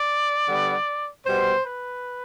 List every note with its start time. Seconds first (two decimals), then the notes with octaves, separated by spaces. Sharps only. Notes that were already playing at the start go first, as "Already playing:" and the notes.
Already playing: D5
0.47 D3 G3 B3
1.25 B2 G3 B3 C5
1.65 B4